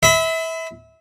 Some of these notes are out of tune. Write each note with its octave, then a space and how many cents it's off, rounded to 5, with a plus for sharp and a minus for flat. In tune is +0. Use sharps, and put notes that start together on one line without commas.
E5 -25 B5 +35